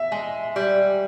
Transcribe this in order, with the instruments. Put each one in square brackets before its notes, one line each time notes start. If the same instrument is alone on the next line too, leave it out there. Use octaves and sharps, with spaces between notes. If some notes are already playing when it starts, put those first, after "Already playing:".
Already playing: [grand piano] E5
[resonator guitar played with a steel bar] G#3
G3